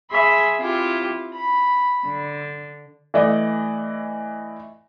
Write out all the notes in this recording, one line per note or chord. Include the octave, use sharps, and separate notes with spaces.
G#4 E5 B5 C6
C4 E4 F4 G4
B5
D3
E3 A3 D5 D#5